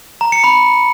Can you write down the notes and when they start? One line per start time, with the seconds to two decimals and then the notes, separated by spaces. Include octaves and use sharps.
0.21 A#5
0.32 C#7
0.44 B5